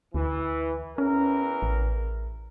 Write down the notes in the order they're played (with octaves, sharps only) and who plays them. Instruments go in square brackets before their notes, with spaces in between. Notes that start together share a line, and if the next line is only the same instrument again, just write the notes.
[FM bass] D2 [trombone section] E3
[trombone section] E2 A#4 [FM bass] C#4
[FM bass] A1